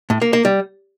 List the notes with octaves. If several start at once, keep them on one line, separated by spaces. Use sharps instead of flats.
A2
A#3
A#3
G3